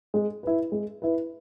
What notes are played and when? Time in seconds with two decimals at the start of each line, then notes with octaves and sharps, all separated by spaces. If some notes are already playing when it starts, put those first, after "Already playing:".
0.14 G#3
0.43 E4 B4
0.72 G#3
1.02 E4 B4